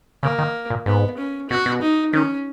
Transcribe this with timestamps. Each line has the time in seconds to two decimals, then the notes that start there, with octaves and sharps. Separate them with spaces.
0.23 C#3 A#3
0.38 D#3
0.70 A#2
0.86 G#2 B3
1.18 C#4
1.50 B2 F#4
1.66 B2
1.81 D#4
2.13 D#3 C#4